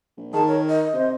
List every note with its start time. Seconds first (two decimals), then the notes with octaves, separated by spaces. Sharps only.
0.17 A#1
0.34 D#3 G#4 A5
0.47 A#4 C#5
0.67 D#5
0.94 C3 C5